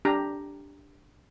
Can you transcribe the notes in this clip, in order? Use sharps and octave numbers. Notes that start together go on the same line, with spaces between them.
D4 G4 A#5